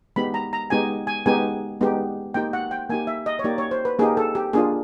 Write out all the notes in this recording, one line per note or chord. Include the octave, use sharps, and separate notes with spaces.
G#3 B3 D#4 G4 B5
A#5
A#5
G#3 B3 D#4 G4 G#5
G#5
G#3 B3 D#4 G4 G#5
G#3 B3 D#4 G4
A#3 D#4 G4 G5
F#5
G5
A#3 D#4 G4 G#5
E5
D#5
C#5
A#3 D#4 G4 D5
C#5
C5
B4
A#3 D#4 G4 G#4
A4
G4
A#3 D4 F4 G#4